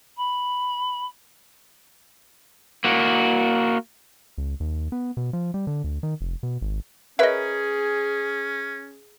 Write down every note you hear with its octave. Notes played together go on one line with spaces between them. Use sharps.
B5
A#3 F#4
C#2
D#2
B3
B2
F3
G3
D3
D2
D#3
F1
B2
G#1
C#4 G#4 A#4 B4 C#5 D#5 E5